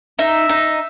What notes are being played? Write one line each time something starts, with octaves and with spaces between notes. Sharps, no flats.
D#4 E5
D#4